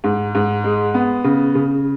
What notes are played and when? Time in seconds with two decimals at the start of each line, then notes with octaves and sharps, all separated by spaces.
0.04 G#2
0.35 G#2
0.64 G#3
0.94 B3
1.24 C#3
1.55 C#3